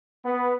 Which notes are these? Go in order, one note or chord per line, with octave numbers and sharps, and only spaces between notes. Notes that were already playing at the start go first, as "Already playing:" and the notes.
B3